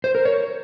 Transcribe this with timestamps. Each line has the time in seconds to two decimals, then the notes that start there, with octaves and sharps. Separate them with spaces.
0.04 C5
0.15 A#4
0.25 C#5